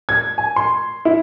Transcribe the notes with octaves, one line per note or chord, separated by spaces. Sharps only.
G#6
G#5
C6
E4